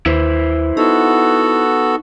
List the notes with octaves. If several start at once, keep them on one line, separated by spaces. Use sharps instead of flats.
D#2 E4 B4 C5
B3 D#4 F#4 A4